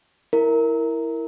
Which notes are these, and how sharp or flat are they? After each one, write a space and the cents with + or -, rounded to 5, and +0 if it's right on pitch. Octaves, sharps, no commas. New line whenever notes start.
E4 -5 A#4 -5